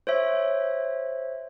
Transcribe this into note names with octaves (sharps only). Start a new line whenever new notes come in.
C5 C#5 E5